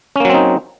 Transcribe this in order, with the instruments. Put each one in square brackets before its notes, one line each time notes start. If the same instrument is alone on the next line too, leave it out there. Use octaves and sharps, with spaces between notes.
[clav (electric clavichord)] C#4
A#3
F#3
C4
D#4